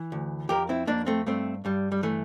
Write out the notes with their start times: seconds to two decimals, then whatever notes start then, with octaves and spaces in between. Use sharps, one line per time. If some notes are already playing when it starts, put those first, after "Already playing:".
Already playing: E3
0.12 D2
0.49 F2 G4 A#4
0.69 C4 E4
0.87 F2 A#3 D4
1.07 A3 C4
1.26 G2 A3 C4
1.65 G2 G3
1.92 G3
2.03 E3 A3